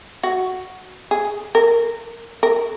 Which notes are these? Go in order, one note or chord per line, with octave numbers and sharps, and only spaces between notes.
F#4
G#4
A#4
A#4